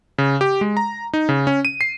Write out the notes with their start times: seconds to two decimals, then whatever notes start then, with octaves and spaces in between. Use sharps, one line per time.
0.18 C#3
0.41 G4
0.61 G#3
0.77 A#5
1.13 D#4
1.29 C#3
1.47 C#4
1.65 D#7
1.81 C7